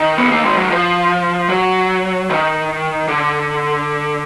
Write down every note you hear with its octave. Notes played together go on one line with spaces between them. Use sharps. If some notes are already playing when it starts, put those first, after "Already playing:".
Already playing: D#3
B3
A#3
G#3
F#3
F3
F#3
D#3
D3